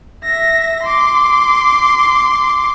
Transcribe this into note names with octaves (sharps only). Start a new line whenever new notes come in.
E5 A#6
C6 D6